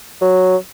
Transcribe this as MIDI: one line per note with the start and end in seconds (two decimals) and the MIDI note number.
0.22 0.56 54